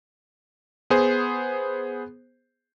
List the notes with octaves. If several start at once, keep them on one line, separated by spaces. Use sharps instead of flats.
B3 G#4 C5